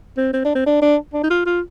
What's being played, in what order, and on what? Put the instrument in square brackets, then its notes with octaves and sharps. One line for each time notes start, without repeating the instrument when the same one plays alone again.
[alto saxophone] C4
C4
D4
C4
D4
D4
D4
D#4
F4
F4